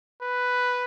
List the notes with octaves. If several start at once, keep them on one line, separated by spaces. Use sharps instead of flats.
B4